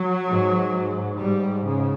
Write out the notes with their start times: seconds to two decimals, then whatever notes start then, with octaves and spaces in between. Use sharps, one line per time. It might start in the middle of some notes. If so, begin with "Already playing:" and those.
Already playing: F#3
0.28 G#2
1.19 G#2 G3
1.66 C#3